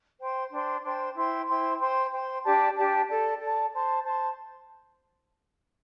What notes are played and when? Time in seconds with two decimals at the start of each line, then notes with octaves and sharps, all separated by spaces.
0.20 C5 G5 C6
0.51 D4 C5 G5 C6
0.84 D4 C5 G5 C6
1.15 E4 C5 G5 C6
1.48 E4 C5 G5 C6
1.80 C5 G5 C6
2.13 C5 G5 C6
2.44 D4 G4 D5 A5
2.76 D4 G4 D5 A5
3.08 A4 D5 A5
3.41 A4 D5 A5
3.73 C5 A5 C6
4.05 C5 A5 C6